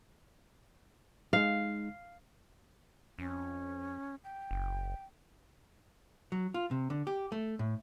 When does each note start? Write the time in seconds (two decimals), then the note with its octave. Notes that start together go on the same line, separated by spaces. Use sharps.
1.33 G#3 D#4 F5
3.19 F2 C#4
4.24 G5
4.51 F#1
6.32 F#3
6.54 F4
6.71 C3
6.90 D3
7.07 G4
7.32 A3
7.59 A2